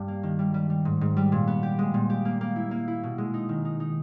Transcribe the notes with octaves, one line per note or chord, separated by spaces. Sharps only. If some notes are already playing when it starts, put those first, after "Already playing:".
Already playing: G2 G3
A#3
D#3
G3
G3
G3
G#2
G#2
G3
A#2
B3
G4
G#3
A#2
G4
A#3
A#3
E4
A#3
E4
B2
G#3
D#4
D#3
D#4
D#4